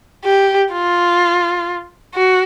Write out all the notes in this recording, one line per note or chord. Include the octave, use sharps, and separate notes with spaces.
G4
F4
F#4